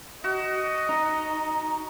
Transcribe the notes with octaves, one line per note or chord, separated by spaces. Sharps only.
F#4 D#5
D#4